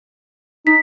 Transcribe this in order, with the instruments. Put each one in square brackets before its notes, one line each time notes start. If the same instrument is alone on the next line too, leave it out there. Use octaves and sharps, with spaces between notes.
[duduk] D#4 [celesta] B6